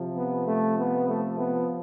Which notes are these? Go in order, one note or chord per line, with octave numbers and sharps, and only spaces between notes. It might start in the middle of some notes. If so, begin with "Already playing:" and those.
Already playing: C3 F3
B3
A3
B3
A3
B3